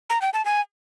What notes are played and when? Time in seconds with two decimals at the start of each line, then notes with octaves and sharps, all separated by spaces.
0.10 A#5
0.22 G5
0.33 A5
0.45 G#5